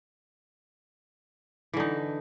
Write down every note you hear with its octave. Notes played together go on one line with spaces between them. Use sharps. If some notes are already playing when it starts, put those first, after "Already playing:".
D3 E3 D#4